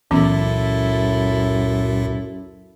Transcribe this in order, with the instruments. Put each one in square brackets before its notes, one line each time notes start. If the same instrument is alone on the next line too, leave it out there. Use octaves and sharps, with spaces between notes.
[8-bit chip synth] C#2 A#2 [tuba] F#2 [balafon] E3 B3 C#4 [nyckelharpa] E4 A4